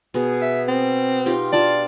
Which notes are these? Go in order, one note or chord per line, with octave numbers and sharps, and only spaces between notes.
B2 G#4
E5
C4
D#4 F4 G4
D4 F4 D5 A5